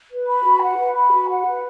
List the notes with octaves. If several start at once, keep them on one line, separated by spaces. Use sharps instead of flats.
B4
B5
F#4
F#5
B4
B5
F#4
F#5
B4